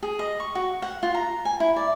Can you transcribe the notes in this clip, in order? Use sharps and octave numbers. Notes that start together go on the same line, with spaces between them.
G#4
D#5
C#6
F#4
F#5
F4
A#5
G#5
E4
D5